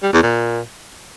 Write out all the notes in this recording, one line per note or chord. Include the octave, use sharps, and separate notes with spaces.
G3
E2
A#2